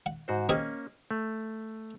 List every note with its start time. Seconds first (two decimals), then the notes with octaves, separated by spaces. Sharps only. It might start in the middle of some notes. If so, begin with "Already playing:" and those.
0.06 F#5
0.28 G#2 F#4 C5
0.49 G#3 A#3 C4 C#4 G#4
1.11 A3